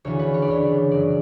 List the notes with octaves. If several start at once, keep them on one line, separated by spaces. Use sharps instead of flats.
D2 C#3 E3 C#5
B4
C#5
D5
D2 C#3 E3 C#5
F#2 C#3 F#3 D5